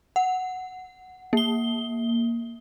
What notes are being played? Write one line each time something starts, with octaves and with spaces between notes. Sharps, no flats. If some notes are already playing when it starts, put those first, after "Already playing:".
F#5
A#3 G7